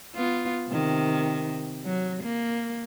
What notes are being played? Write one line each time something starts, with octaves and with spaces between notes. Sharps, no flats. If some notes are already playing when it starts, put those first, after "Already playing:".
B3 F4
C3 D#3
F#3
A#3